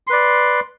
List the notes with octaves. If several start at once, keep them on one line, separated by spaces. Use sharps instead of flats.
B4 D5 C6